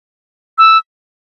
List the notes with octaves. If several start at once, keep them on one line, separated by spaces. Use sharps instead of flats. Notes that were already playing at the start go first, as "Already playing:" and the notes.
E6